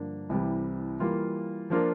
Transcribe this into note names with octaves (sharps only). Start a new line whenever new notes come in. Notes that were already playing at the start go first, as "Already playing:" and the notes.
Already playing: G2 D3 F3 A#3 D4
C2 C3 E3 G3
E3 G3 A#3 F4
F3 A#3 D4 F4 A#4